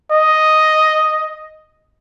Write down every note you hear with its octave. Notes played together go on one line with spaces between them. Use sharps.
D#5